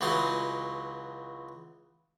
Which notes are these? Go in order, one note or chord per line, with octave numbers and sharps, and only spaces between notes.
C#2 E3 F#3 D#4 C6